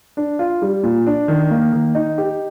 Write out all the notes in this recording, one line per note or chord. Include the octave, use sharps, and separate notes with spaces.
D4
F4
G3
A#2
D4
D#3
A#3
D#3
D#4
G4